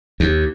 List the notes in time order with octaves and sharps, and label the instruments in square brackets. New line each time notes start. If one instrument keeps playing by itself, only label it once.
[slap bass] D#2